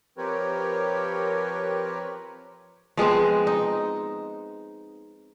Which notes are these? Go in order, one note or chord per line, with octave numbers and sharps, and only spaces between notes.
F3 C4 G4 A#4 B4 C#5
F3 G#3 B3 C4
D#4